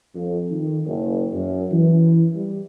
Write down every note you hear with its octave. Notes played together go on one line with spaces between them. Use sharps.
F2
D#3
F#1
F#2
E3
G3